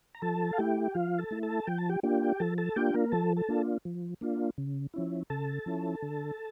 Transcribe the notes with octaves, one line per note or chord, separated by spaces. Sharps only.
A#5
F3 A4 A5
F5
A3 E4 G4 G5
F3 F4 F5
A4 A5
A3 E4
A4 A5
F3 G5
A5
G4 G5
A#3 D4 F4 G4 G5
F3 A4 A5
A4 A5
A#3 D4 F4 G4 G5
A#3 A#4
F3 A4 A5
A4 A5
A#3 D4 F4
F3
A#3 D4 F4
C#3
F3 C#4 E4
C#3 A4 A5
F3 C#4 E4
D3